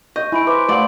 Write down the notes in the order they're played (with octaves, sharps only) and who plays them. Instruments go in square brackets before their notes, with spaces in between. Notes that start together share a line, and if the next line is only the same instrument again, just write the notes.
[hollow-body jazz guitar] D#5 [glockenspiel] C#6 G6
[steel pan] E4 [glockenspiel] G#5 B5 D7
[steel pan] B4 [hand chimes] C5 D6 [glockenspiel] C6
[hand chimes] A3 F5 F#5 [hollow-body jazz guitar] D5 [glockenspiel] C6 F#7